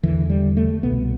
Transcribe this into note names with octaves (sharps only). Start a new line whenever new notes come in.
E2 D3 E3
G3
A3
C2 B2 B3